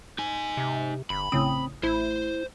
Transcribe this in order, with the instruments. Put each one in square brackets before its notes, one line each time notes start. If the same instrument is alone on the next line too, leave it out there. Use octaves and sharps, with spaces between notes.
[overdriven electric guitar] D#4 G#5
[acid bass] C3
[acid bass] G1 [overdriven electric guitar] B5
[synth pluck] A1 C#3 D#6 [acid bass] C4
[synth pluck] A1 [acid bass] E4 [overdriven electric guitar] C5